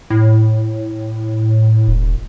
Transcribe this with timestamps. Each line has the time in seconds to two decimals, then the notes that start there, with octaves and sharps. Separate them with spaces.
0.10 A2
1.87 E1